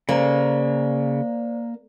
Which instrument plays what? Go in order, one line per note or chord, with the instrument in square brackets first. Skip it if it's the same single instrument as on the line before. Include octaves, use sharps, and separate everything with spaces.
[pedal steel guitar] C#3 [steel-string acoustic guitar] A#3 [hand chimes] C5 D5 A#5